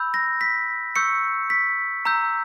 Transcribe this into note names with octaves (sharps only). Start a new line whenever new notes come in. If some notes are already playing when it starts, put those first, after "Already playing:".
Already playing: B5 E6 G6
A#6
B6
C#6 E6 G6 C#7
B6
A#5 E6 G6